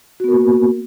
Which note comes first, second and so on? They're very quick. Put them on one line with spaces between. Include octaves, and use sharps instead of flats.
F#4 B3 A#4 A#3